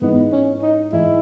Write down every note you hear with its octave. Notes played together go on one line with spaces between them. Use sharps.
G#2 E3 G#3 B3 D#4
C#4
D#4
G#2 E3 G#3 D#4 E4